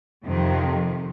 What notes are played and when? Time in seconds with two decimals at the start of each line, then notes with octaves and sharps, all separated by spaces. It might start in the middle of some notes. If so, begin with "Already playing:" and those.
0.24 F2 C3 D#3